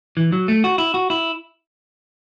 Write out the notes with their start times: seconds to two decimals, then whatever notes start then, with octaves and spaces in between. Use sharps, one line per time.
0.17 E3
0.32 F#3
0.48 A3
0.64 F#4
0.78 E4
0.94 F#4
1.10 E4